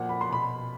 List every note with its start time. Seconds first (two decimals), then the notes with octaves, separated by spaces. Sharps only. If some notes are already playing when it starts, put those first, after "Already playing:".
Already playing: A#2 F3 F#5
0.09 B5
0.21 C6
0.29 B2 B5